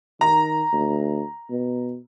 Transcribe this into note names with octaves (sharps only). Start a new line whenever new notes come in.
D#3 A#5
D2
B2